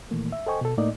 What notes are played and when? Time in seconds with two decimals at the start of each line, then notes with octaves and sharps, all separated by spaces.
0.11 A#2 D#3 E3 A3 A#3
0.32 E5
0.47 A4 C5 D#5 G5 G#5 C#6
0.61 B2 A4
0.78 A2 A3 A#3 D#4 D5 D#5